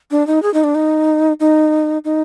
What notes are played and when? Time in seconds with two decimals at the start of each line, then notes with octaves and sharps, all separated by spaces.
0.11 D4
0.27 D#4
0.43 G#4
0.54 D#4
0.64 D4
0.75 D#4
1.40 D#4
2.05 D#4